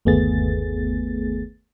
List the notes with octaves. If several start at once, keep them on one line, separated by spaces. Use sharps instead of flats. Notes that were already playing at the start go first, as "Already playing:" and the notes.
G1 D#2 A3 B3 G#4 A6